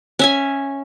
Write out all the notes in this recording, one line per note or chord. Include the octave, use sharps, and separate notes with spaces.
C#4 E5 G#5